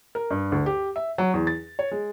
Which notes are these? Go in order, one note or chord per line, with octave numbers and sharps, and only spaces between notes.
A#4
G2
D2
G4
E5
F#3
E2
A6
C#5
G#3